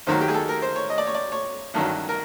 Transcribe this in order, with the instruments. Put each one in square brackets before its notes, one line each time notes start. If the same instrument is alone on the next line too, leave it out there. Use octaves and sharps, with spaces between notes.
[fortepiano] D#2 D#3 F#3 C5
G4
G#4
A4
A#4
C5
C#5
D#5
D5
C#5
D5
C#5
A1 G2 D#3 F#3
A#4